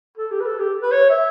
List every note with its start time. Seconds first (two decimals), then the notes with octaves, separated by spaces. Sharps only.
0.18 A4
0.31 G4
0.40 B4
0.46 A4
0.59 G4
0.82 B4
0.92 C#5
1.10 E5